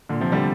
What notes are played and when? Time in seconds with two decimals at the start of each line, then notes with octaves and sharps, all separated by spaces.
0.09 A#2 D3
0.21 C3 F3
0.32 D3 G3